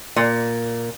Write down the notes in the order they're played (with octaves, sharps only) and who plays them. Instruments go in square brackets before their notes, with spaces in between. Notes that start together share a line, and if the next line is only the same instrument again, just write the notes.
[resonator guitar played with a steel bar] A#2